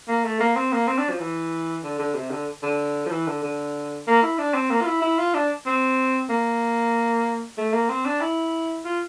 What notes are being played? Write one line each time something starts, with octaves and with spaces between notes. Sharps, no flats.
A#3
A3
A#3
C4
A#3
C4
D4
F3
E3
D3
D3
C3
D3
D3
F3
E3
D3
D3
A#3
E4
D4
C4
A#3
F4
E4
E4
F4
D4
C4
A#3
A3
A#3
C4
D4
E4
F4